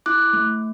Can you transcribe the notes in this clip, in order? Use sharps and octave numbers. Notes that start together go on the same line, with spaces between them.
E4 D6 F#6
A3